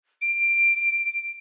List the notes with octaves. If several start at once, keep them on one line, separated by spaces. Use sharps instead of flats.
D7